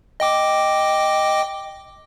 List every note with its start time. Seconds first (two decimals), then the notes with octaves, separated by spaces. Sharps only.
0.20 D#5 G5 D6